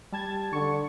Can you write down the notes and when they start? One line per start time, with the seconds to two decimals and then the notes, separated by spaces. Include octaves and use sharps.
0.12 G3 A5 G#6
0.53 D3 C#6